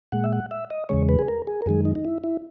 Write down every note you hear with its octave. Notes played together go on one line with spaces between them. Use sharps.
A#2 G#3 F#5
E5
F#5
E5
D#5
E2 C#3 G#3 C#5
B4
G#4
A#4
G#4
A#4
F#2 D#3 G#3 G#4
D#4
D#4
E4
E4